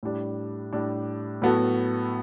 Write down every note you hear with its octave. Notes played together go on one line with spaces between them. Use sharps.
A2 G3 D4
A2 G3 D4
A2 F#3 B3 F#4 A4